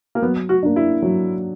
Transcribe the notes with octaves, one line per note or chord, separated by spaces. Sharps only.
A#3
F#3 B3
F#4
A#3 D4
E4
F#3